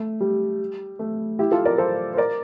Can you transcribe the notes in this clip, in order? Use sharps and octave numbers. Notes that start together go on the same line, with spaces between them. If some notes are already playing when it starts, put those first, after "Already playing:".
Already playing: A3
G3
A3
E4 G4
F4 A4
A#4 D5
A4 C5
C5
A#4 D5